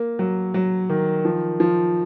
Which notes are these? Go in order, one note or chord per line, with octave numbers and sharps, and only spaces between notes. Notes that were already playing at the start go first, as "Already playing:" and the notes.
Already playing: A#3
F#3
F#3
D#3
F3
F3